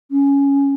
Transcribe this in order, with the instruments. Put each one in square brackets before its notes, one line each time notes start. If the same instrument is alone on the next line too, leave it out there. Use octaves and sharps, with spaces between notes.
[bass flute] C#4